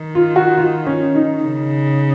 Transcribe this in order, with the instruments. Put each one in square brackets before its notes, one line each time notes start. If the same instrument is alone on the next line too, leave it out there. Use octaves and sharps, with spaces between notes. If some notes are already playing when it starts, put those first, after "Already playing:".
Already playing: [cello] D#3
[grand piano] F4
F#4
F4
C#4
D#4
[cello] C#3